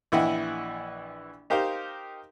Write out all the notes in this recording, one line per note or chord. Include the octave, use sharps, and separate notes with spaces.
A#1 E3 E4 D#5 F#5 G5
D#4 G4 A#4 C5 F5